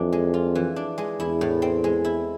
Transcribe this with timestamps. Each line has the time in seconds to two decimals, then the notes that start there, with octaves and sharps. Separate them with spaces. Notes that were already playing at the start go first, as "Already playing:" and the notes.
Already playing: F2 E3 D4
0.13 G#3
0.34 F4
0.55 E3
0.76 D4
0.98 G#3
1.20 E2 E4
1.41 A2
1.62 C4
1.84 G#3
2.05 E4